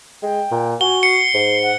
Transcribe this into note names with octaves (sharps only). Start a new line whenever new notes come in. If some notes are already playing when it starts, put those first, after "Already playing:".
G#3 G5
A#2
F#4 G#5 G7
C7 C#7
G#2
F#5